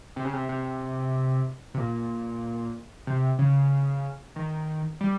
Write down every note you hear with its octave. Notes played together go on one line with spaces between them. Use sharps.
C3
C#3
C3
C3
C3
A#2
C3
C#3
D#3
G3